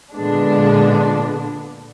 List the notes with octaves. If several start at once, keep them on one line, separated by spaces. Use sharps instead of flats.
A#2 D3 G#3 B3 D4